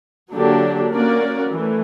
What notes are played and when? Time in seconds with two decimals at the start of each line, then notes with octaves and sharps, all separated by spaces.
0.31 D3 F#3 A#3 D4 G4
0.92 A#3 C#4 F#4 A#4 D5
1.52 E3 A3